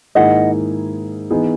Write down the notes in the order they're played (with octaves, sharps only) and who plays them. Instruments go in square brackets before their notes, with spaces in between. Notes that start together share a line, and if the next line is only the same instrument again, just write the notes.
[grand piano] G#2 D#3 A#3 E4 G#4 [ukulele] D#5 F#5
[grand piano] E3 B3 D#4 G#4